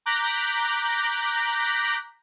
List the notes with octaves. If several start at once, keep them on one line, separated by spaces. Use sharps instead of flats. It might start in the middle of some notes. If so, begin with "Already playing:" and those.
A#5 D6 F#6 G6 A#6 B6